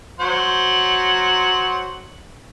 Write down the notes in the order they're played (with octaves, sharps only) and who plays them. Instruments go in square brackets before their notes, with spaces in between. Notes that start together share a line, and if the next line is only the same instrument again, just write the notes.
[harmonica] F#3 C5 F#5